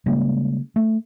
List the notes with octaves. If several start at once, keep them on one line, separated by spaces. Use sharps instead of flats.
C#3 G3 G#3 A#3
A3